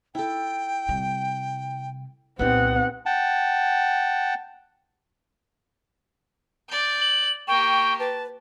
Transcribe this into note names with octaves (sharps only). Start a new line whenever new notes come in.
E4 A4 G5
C3 G3
C2 A#2 B3 C4 D#4 G4 F#5
F#5 G5 A5
D5 G6
F#7
A#3 G4 G5 C#6
B4 A5